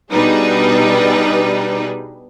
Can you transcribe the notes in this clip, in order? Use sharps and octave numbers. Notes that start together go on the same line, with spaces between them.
B2 G3 D4 D#4 G#4 B4